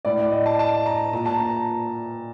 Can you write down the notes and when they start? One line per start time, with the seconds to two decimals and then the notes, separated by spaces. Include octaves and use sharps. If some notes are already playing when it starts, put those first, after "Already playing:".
0.05 A2 D5
0.19 D5
0.32 D#5
0.46 A5
0.59 A5
0.86 A#5
1.13 A#2 A#5
1.26 A5
1.38 A#5